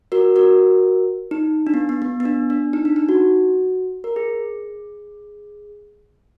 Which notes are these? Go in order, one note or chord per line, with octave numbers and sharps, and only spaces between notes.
F#4 A#4
F#4 A#4
D#4
D4
B3
B3
B3
B3
D4
D4
D#4
D4
D#4
F#4
A#4
G#4